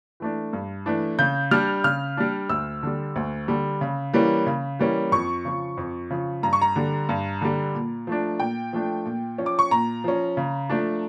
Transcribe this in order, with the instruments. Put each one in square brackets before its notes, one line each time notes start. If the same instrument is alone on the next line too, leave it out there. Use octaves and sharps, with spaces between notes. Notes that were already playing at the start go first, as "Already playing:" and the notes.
[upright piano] E3 A3 D4
G2
E3 A3 D4
C#3 G6
G3 D4 F6
C#3 F6
G3 D4
D2 E6
D3 G3
D2
D3 G3
C#3
E3 G3 A#3 C#4
C#3
E3 G3 A#3 C#4
F2 C#6
C#3 F3
F2
C#3 F3
G2 A#5
C#6
A#5
D3 G3
G2
D3 G3
A#2
F3 A3 D4
A#2 G5
F3 A3 D4
A#2
F3 C#4
D6
C#6
A#2 A#5
F3 C#4
C#3
F3 A3 D4